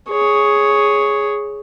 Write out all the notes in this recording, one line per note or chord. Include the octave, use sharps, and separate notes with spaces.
G#4 C#5